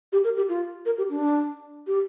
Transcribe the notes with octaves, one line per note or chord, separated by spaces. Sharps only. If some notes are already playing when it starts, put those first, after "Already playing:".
G4
A#4
G4
F4
A#4
G4
D4
G4